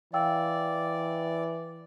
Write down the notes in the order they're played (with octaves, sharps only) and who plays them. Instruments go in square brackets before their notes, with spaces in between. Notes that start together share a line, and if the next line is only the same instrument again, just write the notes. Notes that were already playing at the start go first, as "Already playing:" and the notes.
[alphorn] E3 [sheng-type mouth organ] D5 [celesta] F5 G5 E6